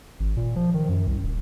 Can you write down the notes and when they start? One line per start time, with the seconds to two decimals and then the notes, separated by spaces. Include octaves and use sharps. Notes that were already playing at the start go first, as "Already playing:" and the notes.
0.20 G#1
0.37 A#2
0.56 F3
0.74 D#3
0.89 F#2
1.07 C2
1.23 D#1